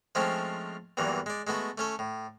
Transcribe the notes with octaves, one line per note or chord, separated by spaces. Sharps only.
F3 G#3 A3 C4 C#4
E2 G2 A#2 E3 F#3
G#3 D5
G#3 A3 B3 F#4
A3 C#4 A4
A2